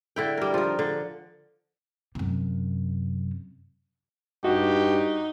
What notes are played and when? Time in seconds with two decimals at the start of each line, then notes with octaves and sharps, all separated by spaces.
0.16 D3 E4 G5
0.37 G3 A#4
0.54 F3 A#4
0.79 D3
2.15 F#2 C3
4.44 G2 D#4 F#4 G4